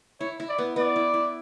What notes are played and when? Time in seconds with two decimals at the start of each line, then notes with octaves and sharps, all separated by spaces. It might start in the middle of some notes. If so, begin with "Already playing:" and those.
0.20 E4 C#5
0.40 E4
0.49 D5
0.58 B3
0.76 B3 D5
0.96 E4
1.14 E4